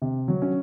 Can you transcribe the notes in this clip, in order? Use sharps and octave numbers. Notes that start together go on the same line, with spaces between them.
C3
F#3
C#4